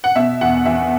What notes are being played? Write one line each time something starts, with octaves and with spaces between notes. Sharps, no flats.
F#5
B2 E5
E2 F#5
E2 E5